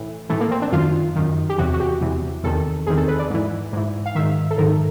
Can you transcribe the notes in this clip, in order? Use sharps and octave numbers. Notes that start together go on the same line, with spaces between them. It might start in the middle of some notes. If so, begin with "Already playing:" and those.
Already playing: A2 E3
A2 E3 A3
A#3
C4
D4
F#2 D#3 F4
F#2 D#3
G4
E2 C3 E3 F#4
F#4
G4
E2 C3 E3
E2 C3 D#3 A4
E2 C3 D#3 G#4
A4
B4
D5
G#2 E3
G#2 E3
F5
G#2 D#3 E5
A4
G#2 D#3 A#4